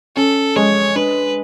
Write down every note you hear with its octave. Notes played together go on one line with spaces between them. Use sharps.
C#4 A4
G#3 C#5
D4 B4